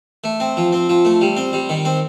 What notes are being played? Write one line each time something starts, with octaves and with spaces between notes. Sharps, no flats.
A3
C4
F3
C4
F3
A3
G3
C4
G3
D#3
C4